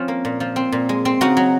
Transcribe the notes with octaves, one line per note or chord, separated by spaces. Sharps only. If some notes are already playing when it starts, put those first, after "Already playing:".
Already playing: F3 C4 C#4 F4
A#3
A#2
F3
C4
A#2
G#3
C4
C#3 D#4 F#4
F#3